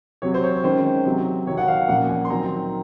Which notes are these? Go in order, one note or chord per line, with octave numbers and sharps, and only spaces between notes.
C3 F#3 C4 C#5
C5
C#5
D#3 G#3 C#4 C5
C3 F#3 C4
C3 D#3 F#3 C#5
F#5
F5
A#2 F3 A#3 C#4 F#5
G#5
C6
D#3 F#3 C4 A#5